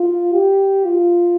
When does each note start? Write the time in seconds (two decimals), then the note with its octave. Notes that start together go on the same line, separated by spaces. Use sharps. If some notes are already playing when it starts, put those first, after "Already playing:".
Already playing: F4
0.33 G4
0.85 F4